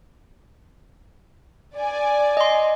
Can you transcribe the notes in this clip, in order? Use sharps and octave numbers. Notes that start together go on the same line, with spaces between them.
D5 G#5
D#5 C6